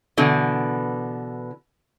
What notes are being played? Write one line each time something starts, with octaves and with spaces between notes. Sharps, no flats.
B2 D3 E3